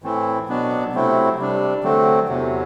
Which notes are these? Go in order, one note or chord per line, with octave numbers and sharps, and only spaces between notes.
A2 E3 A3 C4 E4
B2 F#3 B3 D4
C3 F#3 A3 C4 E4
C3 G3 D4
D3 F#3 A3 C4
E2 C3 F#3